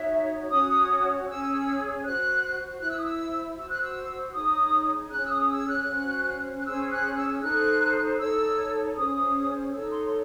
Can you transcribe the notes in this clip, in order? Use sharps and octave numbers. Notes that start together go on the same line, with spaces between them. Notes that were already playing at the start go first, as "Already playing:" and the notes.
Already playing: D#4 F#4 C#5 E5
C#4 F#4 C#5 D#6
C#4 G#4 C#5 E6
F#4 C5 F#6
E4 C5 E6 F#6
D#6
E6
F#4 C5 E6
F#6
E6
D#4 G#4 C#5 D#6
C#4 G#4 C#5 F#6
E6
D#6
E6
F#6
C#4 F#4 C5
F#6
C#4 G#4 C5 E6
F#6
E6
D#4 A4 C5 F#6
D#4 A4 C#5 E6
C#4 G#4 C5 D#6
D#4 A4 C#5 E6
C6